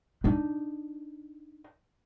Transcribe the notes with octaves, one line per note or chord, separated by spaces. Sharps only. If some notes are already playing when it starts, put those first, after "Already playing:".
D4 D#4